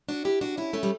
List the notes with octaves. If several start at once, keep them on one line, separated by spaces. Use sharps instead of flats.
D4 F#4
E4 G4
D4 F#4
C#4 E4
A3 C#4
G3